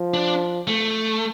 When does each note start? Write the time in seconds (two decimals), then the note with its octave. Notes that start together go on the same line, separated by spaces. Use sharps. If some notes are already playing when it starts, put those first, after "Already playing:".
Already playing: F3
0.14 D4
0.67 A3